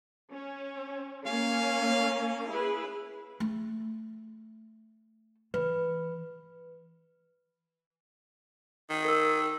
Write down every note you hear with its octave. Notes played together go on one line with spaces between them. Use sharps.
C#4
A#3 C#4 F5
E4 G#4 B4
A3
E3 B4
D#3
A#4 E6